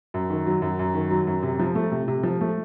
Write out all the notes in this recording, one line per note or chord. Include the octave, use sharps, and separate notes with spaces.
F#2
D#3
F#3
F#2
F#2
D#3
F#3
F#2
C3
F3
A3
C3
C3
F3
A3